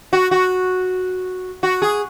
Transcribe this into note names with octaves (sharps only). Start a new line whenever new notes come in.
F#4
F#4
F#4
G#4